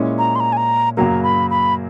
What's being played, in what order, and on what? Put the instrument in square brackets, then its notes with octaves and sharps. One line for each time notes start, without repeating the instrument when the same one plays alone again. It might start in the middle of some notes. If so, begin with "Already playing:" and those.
Already playing: [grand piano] A#2 G#3 C#4 E4
[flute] A#5
C6
A#5
G#5
A#5
[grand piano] F#2 C#3 F#3 A#3 [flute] A#5
[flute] B5
B5